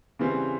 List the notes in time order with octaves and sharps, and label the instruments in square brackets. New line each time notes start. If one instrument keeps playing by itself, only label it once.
[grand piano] C#3 E3 G3 C4